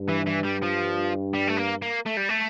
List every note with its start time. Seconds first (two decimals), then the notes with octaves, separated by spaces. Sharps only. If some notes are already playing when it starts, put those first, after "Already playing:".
Already playing: G2
0.09 E3
0.27 E3
0.45 G3
0.63 F3
1.34 G3
1.48 A3
1.58 A#3
1.82 A#3
2.06 A3
2.17 G3
2.29 A3